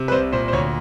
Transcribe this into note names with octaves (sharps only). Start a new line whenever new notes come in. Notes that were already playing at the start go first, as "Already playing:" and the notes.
Already playing: C3
B4
C2 C5
A#2 C5
C5
D2 C#5